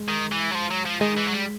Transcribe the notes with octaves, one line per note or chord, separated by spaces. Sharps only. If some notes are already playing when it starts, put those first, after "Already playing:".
Already playing: G#3
D#3
E3
F#3
F3
F#3
F3
D#3 G#3
E3
F#3
G3